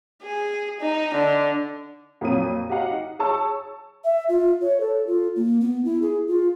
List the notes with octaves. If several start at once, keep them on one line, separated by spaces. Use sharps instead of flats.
G#4
D#4
D3
F2 A#2 F#3 D#6 D#7
F#4 G4 D#5 F5 F#5
D#4
G#4 C#5 A5 C#6 E6
E5
F4
C#5
A4
F4
A#3
B3
E4
G#4
F4